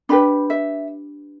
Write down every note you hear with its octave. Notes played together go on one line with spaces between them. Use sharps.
D4 G4 B4 B5
E5